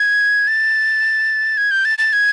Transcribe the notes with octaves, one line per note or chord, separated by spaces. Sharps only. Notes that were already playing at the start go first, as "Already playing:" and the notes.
Already playing: G#6
A6
G#6
G6
A6
A6
G#6